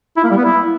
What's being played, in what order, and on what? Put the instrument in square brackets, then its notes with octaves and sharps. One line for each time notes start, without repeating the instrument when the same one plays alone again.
[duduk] E4
A#3
G3
B3
E4